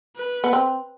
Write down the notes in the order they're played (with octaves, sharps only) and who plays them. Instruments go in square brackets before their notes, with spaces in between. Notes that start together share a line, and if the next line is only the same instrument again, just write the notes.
[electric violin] B4
[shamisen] B3
C4